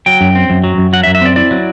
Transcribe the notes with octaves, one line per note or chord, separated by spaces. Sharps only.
F#3 G5
F#2
C4
F#2
F#3
F#2
F#3 F#5
E5
F#2
E5
C4 D5
E4 D5
F#3